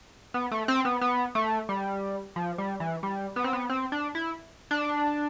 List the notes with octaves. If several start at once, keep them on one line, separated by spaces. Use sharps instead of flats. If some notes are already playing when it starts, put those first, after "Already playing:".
B3
A3
C4
B3
B3
A3
G3
F3
G3
E3
G3
B3
C4
B3
C4
D4
E4
D4